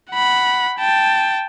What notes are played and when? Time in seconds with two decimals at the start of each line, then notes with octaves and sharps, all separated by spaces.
0.12 F#5 B5
0.79 G5 A5